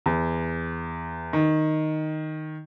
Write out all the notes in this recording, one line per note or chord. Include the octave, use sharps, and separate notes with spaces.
E2
D#3